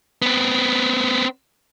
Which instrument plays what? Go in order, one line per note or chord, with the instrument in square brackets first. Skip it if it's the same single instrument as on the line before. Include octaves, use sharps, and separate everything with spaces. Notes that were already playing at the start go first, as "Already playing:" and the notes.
[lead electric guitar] B3 C4